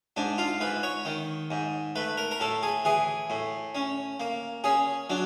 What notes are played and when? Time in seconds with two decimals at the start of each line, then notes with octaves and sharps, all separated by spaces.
0.16 G#2 D4
0.38 F4
0.60 G#2 B4
0.83 C#5
1.05 D#3
1.51 G#2
1.96 A3 B4
2.17 A#4
2.31 A#4
2.40 A2 A4
2.63 G#4
2.85 E3 G#4
3.30 A2
3.75 C#4
4.20 A#3
4.64 C#4 G#4
5.10 F#3 D4